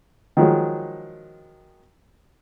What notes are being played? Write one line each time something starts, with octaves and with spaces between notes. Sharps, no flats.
D#3 F3 F#3 G#3